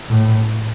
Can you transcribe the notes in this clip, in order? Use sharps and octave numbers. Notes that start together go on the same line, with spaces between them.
A2